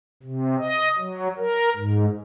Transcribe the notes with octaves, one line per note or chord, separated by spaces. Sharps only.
C3
D#5
F#3
A#4
G#2